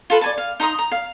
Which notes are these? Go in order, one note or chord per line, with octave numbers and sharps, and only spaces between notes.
F4 A4 B4
D5 G#5 A5
F5
D#4 A#5 C6 D#6
A#5
F5